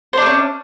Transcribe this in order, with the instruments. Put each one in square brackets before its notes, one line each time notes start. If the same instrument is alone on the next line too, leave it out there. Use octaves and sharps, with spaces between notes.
[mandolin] C5
D4
A3
C#4